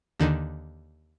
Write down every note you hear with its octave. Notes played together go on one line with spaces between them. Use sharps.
D#2 D3 D#3